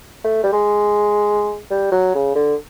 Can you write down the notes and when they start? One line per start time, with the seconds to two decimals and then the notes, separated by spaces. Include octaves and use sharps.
0.24 A3
0.43 G3
0.52 G#3
1.71 G3
1.92 F#3
2.14 C#3
2.35 D3